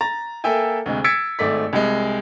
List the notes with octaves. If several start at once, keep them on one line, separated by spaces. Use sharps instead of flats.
A#5 A6
A#3 A4 E5 G5 G#5
D2 C3 G#3
E6 G#6 A6 B6 C#7 D7
G#1 G#2 A3 D5 B6
C2 G#3